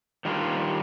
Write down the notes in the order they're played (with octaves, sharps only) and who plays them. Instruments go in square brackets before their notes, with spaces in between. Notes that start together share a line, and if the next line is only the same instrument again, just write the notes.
[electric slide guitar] D#3 G3 D4 F4